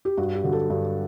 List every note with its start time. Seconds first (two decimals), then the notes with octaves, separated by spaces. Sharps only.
0.05 G4
0.17 G2 F#4
0.35 G4
0.44 D3 F#3
0.52 A4
0.70 G2